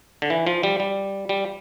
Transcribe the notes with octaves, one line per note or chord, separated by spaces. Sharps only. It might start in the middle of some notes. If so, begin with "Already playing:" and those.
D3
E3
F3
G3
G3
G3